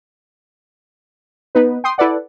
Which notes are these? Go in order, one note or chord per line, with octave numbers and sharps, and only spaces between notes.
B3 D#4 B4
G5 C6 D#6
E4 A4 B4 D5 F#5